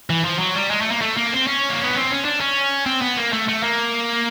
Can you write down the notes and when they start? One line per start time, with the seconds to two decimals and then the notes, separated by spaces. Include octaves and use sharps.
0.10 E3
0.25 F3
0.39 F#3
0.55 G3
0.71 G#3
0.82 A3
0.92 A#3
1.02 A3
1.17 A#3
1.33 C4
1.47 C#4
1.69 A#3
1.83 B3
1.97 C4
2.11 C#4
2.25 D4
2.40 C#4
2.86 C4
3.01 B3
3.17 A#3
3.33 A3
3.48 A3
3.63 A#3